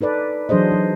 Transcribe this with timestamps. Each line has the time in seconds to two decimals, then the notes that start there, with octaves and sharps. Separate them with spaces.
0.01 D#4 A4 B4 D5
0.49 E3 F#3 D4 G#4 C5 D#5
0.72 F#3 D#4